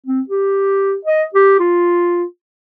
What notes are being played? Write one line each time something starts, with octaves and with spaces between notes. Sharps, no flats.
C4
G4
D#5
G4
F4